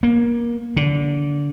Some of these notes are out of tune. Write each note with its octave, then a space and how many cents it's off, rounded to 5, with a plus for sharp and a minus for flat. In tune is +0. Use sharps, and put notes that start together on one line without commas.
A#3 +20
D3 -20